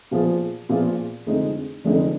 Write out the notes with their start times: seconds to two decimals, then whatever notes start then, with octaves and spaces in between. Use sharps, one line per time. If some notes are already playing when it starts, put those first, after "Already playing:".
0.11 A#2 F3 B3 F4 G#4
0.69 A#2 F3 B3 F4 G#4
1.26 F1 F2 D3 G#3 D#4
1.84 F1 F2 D3 G#3 D#4